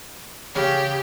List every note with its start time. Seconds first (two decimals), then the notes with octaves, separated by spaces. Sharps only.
0.56 C#3 G4